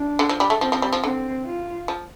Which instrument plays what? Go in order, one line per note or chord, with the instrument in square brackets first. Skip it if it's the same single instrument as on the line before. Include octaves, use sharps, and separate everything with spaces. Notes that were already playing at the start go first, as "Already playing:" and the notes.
Already playing: [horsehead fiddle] D4
[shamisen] D3
F3
G3
A3
[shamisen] F3 [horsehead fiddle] C4
[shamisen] F3
G3
F3
[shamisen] D3 [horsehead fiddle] C4
[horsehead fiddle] F4
[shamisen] F3